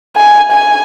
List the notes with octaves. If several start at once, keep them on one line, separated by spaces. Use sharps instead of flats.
G#5
G#5